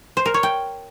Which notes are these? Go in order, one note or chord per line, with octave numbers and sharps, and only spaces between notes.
C5
A#4
C#5
G5